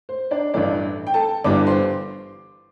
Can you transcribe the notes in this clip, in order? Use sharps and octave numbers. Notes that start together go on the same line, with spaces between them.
C5
D4 D5
A1 G2 E3 A3 D4 D5
G5
A4 A5
G1 G2 E3 G3 D5 D6
C5 C6